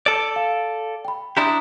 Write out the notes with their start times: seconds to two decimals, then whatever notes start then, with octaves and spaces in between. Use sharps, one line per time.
0.06 A4 D5
0.36 F5
1.05 G5 B5
1.37 D4 E4 G4 A#5 C6 D#6